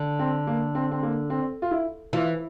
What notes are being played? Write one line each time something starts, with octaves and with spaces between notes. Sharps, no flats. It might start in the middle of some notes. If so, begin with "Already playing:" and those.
Already playing: D3
C4
A#3
C4
C4
A#3
C4
F4
E4
E3 F4